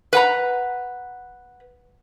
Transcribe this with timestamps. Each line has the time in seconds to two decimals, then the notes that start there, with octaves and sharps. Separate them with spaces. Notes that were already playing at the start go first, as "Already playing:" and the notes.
0.13 B4 F#5 A#5